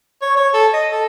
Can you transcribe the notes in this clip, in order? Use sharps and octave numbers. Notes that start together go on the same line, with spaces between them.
C#5
C#5
A4
D#5
A4